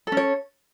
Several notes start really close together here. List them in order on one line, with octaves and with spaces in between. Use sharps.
A4 C#4 C#5